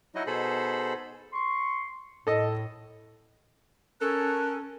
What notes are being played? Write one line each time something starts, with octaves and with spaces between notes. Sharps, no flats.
F#3 D#4 E4 F#4 D#5
B2 D#4 G#4 A4 C5 B5
C6 C#6
A2 A4 D#5
C#4 A4 A#4 F#6